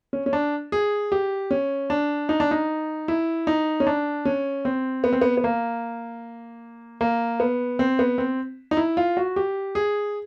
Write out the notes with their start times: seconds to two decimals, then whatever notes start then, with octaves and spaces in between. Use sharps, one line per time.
0.13 C#4
0.26 C#4
0.33 D4
0.72 G#4
1.12 G4
1.51 C#4
1.90 D4
2.29 D#4
2.40 D4
2.51 D#4
3.08 E4
3.47 D#4
3.80 C#4
3.87 D4
4.25 C#4
4.65 C4
5.04 B3
5.13 C4
5.21 B3
5.37 B3
5.44 A#3
7.01 A#3
7.40 B3
7.79 C4
7.99 B3
8.18 C4
8.71 D#4
8.77 E4
8.97 F4
9.17 F#4
9.36 G4
9.75 G#4